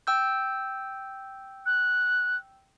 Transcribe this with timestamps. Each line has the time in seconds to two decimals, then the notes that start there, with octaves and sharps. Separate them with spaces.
0.07 G5 E6 G6
1.66 F#6